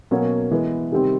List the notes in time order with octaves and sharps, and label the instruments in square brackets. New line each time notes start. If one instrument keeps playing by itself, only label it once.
[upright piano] B2 F#3 A#3 C#4
E3 G#3 B3
C3 D#3 G3 C4